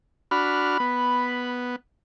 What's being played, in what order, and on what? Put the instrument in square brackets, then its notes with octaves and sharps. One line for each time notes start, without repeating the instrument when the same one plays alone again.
[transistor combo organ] D4 F#4 F6 [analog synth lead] B5
[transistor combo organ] B3